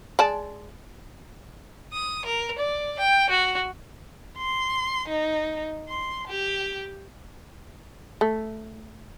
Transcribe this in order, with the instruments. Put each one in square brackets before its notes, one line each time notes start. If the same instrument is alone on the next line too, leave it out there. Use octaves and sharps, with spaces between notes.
[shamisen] G#3 D5 A5
[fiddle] D#6
A#4
D5
G5
F#4
[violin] C6
D#4
C6
G4
[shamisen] A3